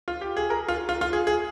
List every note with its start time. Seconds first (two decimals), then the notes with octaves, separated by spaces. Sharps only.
0.08 F4
0.21 G4
0.37 G#4
0.50 A#4
0.68 F4
0.89 F4
1.01 F4
1.13 G#4
1.27 G#4